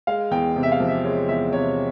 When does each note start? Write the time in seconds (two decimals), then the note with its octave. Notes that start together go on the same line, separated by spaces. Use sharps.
0.07 G#3 F5
0.31 E2 G5
0.56 C3
0.63 E5
0.72 F5
0.80 F3
0.88 E5
1.04 G#3 C#5
1.29 E2 E5
1.53 C3 C#5